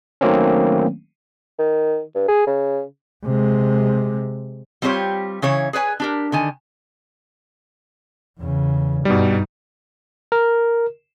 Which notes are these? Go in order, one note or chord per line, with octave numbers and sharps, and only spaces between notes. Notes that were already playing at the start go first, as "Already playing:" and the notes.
D#3 F#3 A3 A#3 C4 C#4
D#3
G2
G#4
C#3
C3 G#3
G3 C4 F4 G4 C#5
C#3 E3 C#5
G#4 B4 C#5 G#5
D4 G4 A#4
D3 D#3 G#5
E2 C#3
G2 B2 G3 D#4
A#4